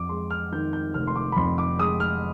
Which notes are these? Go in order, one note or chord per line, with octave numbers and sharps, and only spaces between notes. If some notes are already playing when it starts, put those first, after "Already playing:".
Already playing: F2 D6
G#3 C6
F6
D#3 G6
G6
F1 F6
C6
D6
B5
F2 C6
D6
G#3 D#6
F6